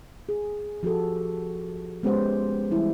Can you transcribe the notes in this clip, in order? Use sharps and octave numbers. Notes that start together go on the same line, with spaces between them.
G#4
F3 F#4 G4 A4
G#3 B3 C#4 G4 C5 F#5
E3 G3 E4